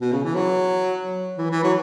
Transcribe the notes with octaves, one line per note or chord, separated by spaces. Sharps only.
B2
C#3
E3
F#3
E3
E3
F#3